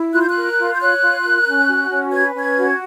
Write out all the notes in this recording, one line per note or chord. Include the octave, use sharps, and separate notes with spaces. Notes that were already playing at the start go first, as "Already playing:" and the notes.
Already playing: E4
F4 F#6
G6
F#6
A#4
F4
G6
C#5 F#6
F4
A#4
C#4
F#4
C#4
B4 G#6
C#4 G#6
F#4